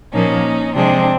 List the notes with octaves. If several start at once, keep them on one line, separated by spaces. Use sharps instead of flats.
A#2 F3 A#3 C#4 D#4
C3 F3 G#3 C4 D4